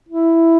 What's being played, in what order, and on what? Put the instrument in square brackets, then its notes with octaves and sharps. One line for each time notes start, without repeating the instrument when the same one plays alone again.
[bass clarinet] E4